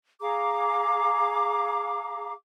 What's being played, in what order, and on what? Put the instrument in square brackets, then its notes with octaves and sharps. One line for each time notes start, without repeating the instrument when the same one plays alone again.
[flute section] G#4 F5 A#5 D6